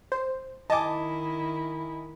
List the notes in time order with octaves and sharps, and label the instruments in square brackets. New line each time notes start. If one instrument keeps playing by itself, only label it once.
[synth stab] C5
[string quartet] D#3 E4 [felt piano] D#5 G#5 [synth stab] A5 D6